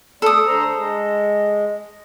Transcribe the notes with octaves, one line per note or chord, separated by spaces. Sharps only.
A3 A4 D5 D#6
D3 C5 A#5
G#3